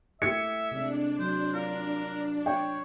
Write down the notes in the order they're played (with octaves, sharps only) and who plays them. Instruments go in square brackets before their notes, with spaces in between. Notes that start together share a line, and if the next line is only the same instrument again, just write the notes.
[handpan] A3 E4 G4 [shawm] E5 [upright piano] G#6 C#7
[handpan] C3 G#3 [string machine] D4
[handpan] F#3 [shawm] C5
[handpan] F4 [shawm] A#4
[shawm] C#5 [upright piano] G5